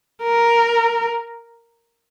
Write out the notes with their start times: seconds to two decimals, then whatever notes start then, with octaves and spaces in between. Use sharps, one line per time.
0.23 A#4